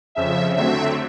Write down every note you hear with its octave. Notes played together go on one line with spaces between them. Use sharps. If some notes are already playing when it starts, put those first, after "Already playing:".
F2 C#3 F3 E5
D3 F#3 A3 C4 E5